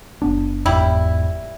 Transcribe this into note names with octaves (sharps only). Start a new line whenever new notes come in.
F#1 B3 D4
E2 G#2 G3 E4